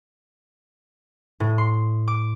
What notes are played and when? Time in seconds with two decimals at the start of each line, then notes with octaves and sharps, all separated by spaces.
1.40 A2
1.58 C6
2.08 D6